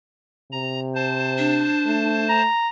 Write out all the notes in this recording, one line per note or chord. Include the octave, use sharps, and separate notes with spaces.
C3 A#5
C5 A5
D4
A3
A#5